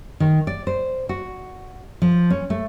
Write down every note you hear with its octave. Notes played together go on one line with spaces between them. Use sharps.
D#3
D5
C5
F#4
F3
C#4
A3